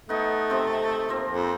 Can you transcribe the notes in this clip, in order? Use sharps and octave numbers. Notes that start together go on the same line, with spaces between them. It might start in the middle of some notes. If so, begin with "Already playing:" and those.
A3 B3 D#4
C3 C4
F3 A#3 C4
F2